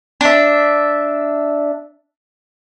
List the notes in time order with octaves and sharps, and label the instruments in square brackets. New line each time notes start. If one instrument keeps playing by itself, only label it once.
[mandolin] D4 E5